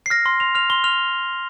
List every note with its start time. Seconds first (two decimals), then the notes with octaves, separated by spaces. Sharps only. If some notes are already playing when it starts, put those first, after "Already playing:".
0.06 C7
0.10 F6 A#6
0.26 C6
0.40 C6 F7
0.55 F6 F7
0.70 C6 G7
0.84 F6 F7